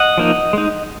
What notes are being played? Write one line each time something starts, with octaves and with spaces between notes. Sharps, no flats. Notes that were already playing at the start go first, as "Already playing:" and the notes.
Already playing: D#5 F#5
F3 A#3 D#4
G#3 D#4